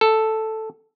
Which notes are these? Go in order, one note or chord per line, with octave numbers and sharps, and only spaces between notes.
A4